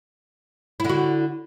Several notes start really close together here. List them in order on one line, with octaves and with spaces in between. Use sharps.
E4 D3 F#4